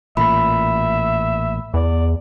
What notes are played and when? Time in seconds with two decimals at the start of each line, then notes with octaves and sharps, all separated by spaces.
0.17 A1 A#2 E5 B5
1.74 E2 D5